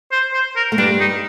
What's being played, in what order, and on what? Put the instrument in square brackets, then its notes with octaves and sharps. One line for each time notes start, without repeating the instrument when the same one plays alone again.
[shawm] C5
C5
A#4
[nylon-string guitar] A3
[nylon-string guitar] G2 G3 [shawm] D4
[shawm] D#4